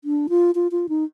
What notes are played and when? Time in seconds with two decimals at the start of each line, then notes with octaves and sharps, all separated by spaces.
0.04 D4
0.29 F4
0.55 F4
0.72 F4
0.89 D#4